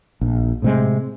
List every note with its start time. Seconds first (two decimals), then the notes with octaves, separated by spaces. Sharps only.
0.21 A#1
0.62 A2 C3 G#3